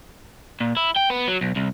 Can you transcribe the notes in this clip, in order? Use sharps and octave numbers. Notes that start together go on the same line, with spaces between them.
A#2
E4
G5
B3
F#3
B1
C2